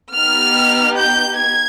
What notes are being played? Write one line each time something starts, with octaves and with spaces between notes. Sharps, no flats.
B3 D#4 G4 F6
G6
G#6